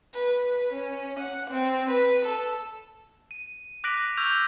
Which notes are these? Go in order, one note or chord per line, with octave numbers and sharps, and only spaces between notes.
B4
C#4
F#5
C4
B4
A4
D#7
D6 F#6 A#6 B6 D7 F#7
C#6 E6 F6 G6 G#6 F7